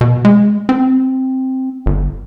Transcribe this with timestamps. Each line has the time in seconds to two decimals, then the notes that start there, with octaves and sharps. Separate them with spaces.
0.01 B2
0.25 G#3
0.69 C4
1.86 G1